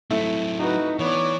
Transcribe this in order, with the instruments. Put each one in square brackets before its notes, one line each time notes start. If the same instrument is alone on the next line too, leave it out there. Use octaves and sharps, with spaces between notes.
[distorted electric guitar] F#3 C4 [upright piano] A3 E4
[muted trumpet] D#4 [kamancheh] F#4 B4
[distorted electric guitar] E3 [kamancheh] B3 D5 [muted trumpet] C#5